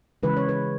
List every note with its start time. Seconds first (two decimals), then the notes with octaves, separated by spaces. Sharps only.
0.23 C#3 E3 G#3 B4
0.37 C#5
0.49 B4